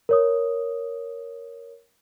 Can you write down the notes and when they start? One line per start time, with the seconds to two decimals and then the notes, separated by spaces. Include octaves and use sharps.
0.09 A#4 C#5 D#6